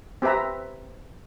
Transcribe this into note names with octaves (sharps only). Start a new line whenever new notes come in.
C4 G4 B4 E5 A#5